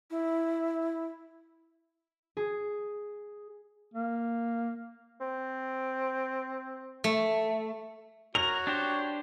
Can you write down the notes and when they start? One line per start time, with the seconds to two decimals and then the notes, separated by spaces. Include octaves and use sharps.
0.11 E4
2.37 G#4
3.94 A#3
5.21 C4
7.04 A3
8.35 F#4 A#4 C#5 F7
8.67 D4 G4 C5